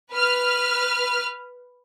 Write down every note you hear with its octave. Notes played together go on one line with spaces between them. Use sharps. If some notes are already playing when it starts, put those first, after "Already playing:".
B4 F6